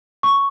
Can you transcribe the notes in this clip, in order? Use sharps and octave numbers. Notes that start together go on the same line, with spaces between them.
C#6